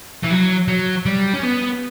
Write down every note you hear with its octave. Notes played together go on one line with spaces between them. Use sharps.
E3
F#3
F#3
G3
C#4
B3